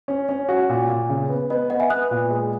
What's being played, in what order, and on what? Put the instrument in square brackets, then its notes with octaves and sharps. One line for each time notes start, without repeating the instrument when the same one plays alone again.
[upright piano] C#4
C#4
F#4
A#2
A#2
C#3
B3
[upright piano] B3 [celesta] D#5
[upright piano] B3 [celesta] D#5 F#5
[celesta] E5 G#5
[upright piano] B3 [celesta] D#6 F#6
[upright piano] A#2
G#3